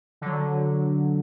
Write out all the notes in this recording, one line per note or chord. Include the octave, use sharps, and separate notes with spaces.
D3 F#3